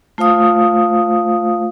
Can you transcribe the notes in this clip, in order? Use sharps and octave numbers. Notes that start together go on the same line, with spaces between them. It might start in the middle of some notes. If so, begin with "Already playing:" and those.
A3 F4 C5 F5 D#6